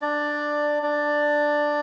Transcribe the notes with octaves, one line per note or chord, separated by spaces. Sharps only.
D4 D5
D4 D5